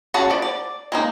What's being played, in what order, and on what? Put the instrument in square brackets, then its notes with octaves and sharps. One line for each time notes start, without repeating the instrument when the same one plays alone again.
[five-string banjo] C#4 F#4 G#4 F#5 A5
F3 D5
D5
G#3 A#3 D#4